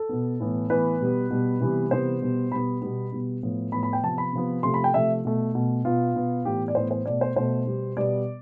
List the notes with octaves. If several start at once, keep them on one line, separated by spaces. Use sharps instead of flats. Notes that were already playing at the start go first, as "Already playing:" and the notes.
Already playing: A4
B2 B3
A2 E3 B3
A2 E3 B3 B4
B2 G3 B3
B2 G3 B3
C3 E3 G3 B3
C3 E3 G3 B3 C5
B2 G3 B3
B2 G3 B3 B5
B2 G3 B3
B2 G3 B3
A2 F3 B3
A2 F3 B3 B5
B5
G5
C3 F3 B3 A5
B5
C3 F3 B3
C3 F3 A3 C6
B5
G5
C3 F3 A3 E5
B2 A3
B2 A3
B2 B3 F4
B2 B3
A2 E3 B3 G4
D5
A2 E3 B3 C5
C5
B2 A3 D5
C5
B2 A3 C5
B2 G3 B3
B2 G3 B3 D5